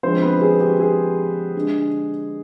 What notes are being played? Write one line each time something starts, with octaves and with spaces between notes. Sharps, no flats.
D3 F3 G#3 C4 C5
B3 B4
G#4
G4
G#4
D3 G#3